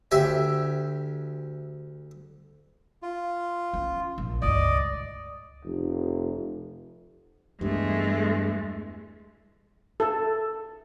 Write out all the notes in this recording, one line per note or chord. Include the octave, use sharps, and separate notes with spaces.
D2 G4 E5 G5 G#5
F4
C#4
A#1
C#2 G2 D5 D#5
F1
E2 G2 G#3 A3
A4